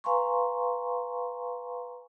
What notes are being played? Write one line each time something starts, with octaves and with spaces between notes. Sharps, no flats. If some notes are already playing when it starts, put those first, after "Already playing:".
B4 F5 G#5 A#5 C6 C#6